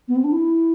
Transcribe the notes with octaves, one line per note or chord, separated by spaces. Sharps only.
B3
C4
D4
E4